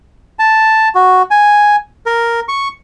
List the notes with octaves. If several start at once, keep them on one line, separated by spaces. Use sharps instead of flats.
A5
F#4
G#5
A#4
C#6